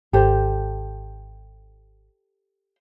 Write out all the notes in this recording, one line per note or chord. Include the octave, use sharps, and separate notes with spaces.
G#1 G4 A4 C5